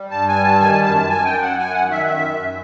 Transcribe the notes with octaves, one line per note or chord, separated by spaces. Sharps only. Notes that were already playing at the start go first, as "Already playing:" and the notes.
Already playing: G3
G2 A5
G#5
G3
A5
D#3 G#5
A5
F#2 A5
A5
F#2 G#5
G5
F#2
F#5
F#2 G#5
F#5
D#3
E5
F#2 E5
F#2